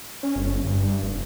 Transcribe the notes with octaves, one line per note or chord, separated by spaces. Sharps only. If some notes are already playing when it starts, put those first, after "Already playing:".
C#4
G1
G2
F1